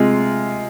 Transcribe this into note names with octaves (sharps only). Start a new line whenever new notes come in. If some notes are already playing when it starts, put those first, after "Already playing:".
Already playing: C3 G#3 F4